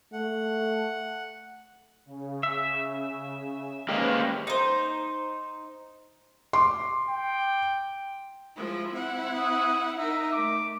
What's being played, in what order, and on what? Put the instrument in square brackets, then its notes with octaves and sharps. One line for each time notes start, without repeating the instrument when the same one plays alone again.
[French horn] A3 [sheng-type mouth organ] F#5
[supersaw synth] C#3
[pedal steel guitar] E5
[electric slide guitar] G#3 A#3 G4 [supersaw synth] C#4 B4 C5
[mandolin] D#4 C5
[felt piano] C6 D6
[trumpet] G5
[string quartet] F3 G#3 E4
C4 E4 F#5
[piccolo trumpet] D#6
[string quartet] D#4 A#4 [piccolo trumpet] E5
[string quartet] A3 [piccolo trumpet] D6